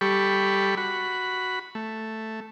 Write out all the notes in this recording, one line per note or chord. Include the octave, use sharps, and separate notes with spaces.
G3 G4 A4 B5 C#6
F#4 B5
A3